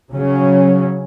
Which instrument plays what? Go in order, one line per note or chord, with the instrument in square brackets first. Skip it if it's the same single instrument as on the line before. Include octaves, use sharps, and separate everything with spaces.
[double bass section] C#3 F#3 C#4